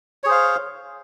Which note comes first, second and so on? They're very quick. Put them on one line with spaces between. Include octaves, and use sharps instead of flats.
C#5 G#4 C5 F5